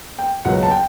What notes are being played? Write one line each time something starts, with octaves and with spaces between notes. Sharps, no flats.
G5
C#2 B2 F#3 B3 F#5
A5
G5